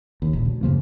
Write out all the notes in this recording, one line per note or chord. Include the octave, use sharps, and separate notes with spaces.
D#2
D#1 A#1
D2
F#2 C#3 F3 A#3